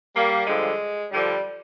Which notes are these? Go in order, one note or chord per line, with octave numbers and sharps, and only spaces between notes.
G3 A#3
G2 D3 F3 G#3
G2 D3 F3 G3